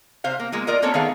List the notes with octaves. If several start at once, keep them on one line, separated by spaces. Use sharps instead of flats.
C3 C5 F5
A#3
G#3 A#3 F4
F4 A#4 D5 D#5
A#3 C4 C#4 A4 C#5
D#3 A3 B3 G#4 F5